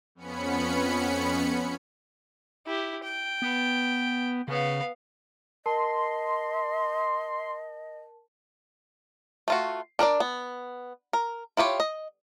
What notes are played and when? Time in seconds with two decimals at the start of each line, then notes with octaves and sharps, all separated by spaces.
0.15 F2 B3 C#4 B5 C#7
2.66 E4 G4
3.03 G5
3.42 B3
4.48 C#3 B3 F5
5.66 A#4 D#5 A5 C6
9.48 A3 F4 F#4
9.99 D4 A#4 B4 D5
10.20 B3
11.13 A#4
11.57 E4 F4 G4 C#5
11.80 D#5